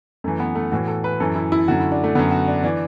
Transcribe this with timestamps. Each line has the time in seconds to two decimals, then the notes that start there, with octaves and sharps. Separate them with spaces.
0.24 F#2 E3 A3
0.40 B3
0.55 A3
0.72 A2 E3 F#4
0.88 A4
1.04 B4
1.20 F#2 E3 A4
1.36 E4
1.52 E4
1.68 F#2 D3 F#4
1.80 E4
1.92 D4
2.04 A3
2.15 F#2 D3 B3
2.31 F#4
2.48 D4
2.64 E3 D4